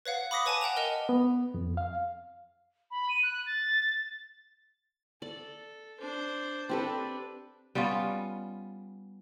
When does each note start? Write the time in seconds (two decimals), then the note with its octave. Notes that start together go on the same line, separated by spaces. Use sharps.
0.06 B4 C#5 F5 F#5
0.31 B5 D6 D#6 A#6 B6
0.46 B4 C#5 G#5 A5 D6 D#7
0.61 F#5 G5 E7 F7
0.77 A#4 D#5 F7
1.09 B3
1.54 F2
1.77 F5
2.91 B5
3.09 D#7
3.23 F#6
3.46 A6
5.22 A4 D5
6.00 D4 C5
6.69 C4 D4 G4 A4 B4
7.75 G3 B3 C#4 F4